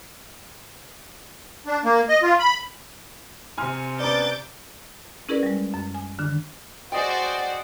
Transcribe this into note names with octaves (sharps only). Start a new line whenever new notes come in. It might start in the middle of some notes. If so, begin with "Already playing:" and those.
D4
A#3
D#5
F4
B5
C3 G#5 C6 F6
B3 C#4 D4 D5 A#5 D6 G6 A6
C#4 E4 G#4 A#4 B4 D5
G3 G#3
F#2
G#5
D3 D#3 D4
F#4 G#4 C5 D5 D#5 G5